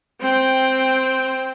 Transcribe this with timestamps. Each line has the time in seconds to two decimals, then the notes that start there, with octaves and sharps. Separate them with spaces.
0.21 C4 G5